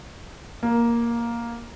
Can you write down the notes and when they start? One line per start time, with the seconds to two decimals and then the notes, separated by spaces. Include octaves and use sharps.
0.63 A#3